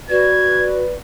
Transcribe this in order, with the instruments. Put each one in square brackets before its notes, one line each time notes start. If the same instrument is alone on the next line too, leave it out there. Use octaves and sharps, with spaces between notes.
[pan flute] F#4 [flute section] B4 D5 [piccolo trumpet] G#6